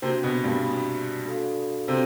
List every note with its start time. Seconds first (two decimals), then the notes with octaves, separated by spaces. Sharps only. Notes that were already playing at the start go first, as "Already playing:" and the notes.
0.02 C3 A#3 C4 D4 F#4
0.23 B2 B3
0.44 G2 G3
0.65 A#3 D4 F#4
1.26 D4 F#4 A4 D5 F5
1.88 C3 C4 D4 F#4 A4 D5 F5